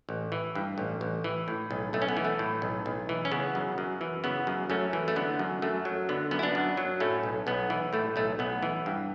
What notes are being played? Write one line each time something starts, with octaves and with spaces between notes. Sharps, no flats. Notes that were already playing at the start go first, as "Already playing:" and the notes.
A1
E3
G2
A1
A1
E3
A2
B1
B1 A3
C#4
B3
E3
A3
A2
B1
B1
E3
C#4
C#3 B3
F#2
F#2
E3
C#3 B3
F#2
F#2 A3 C#4
E3
A3
D3 B3
F#2
F#2 A3
F#3
D3 B3
F#2 B3
E4
B3 D4
F#2
F#3
A2 A3 C#4
B1
B1 B3
E3
A2 A3
B1 A3
B1 B3
E3
G2